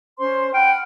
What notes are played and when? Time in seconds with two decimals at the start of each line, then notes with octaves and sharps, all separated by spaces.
0.18 C#4 C5 C6
0.54 F#5 G5 B5 F6